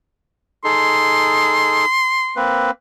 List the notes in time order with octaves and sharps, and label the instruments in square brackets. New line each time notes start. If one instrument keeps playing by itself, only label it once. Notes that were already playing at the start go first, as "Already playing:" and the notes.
[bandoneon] D#4 G#4 A4 [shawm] C6
[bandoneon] A#3 C4 B4